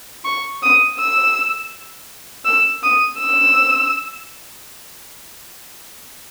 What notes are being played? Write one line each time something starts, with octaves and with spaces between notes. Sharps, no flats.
C#6
D#6
E6
E6
D#6
E6